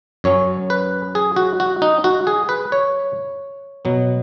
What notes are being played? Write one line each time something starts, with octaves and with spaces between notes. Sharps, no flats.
F#2 F#3 C#4 C#5
B4
G#4
F#4
F#4
D#4
F#4
G#4
B4
C#5
B2 F#3 B3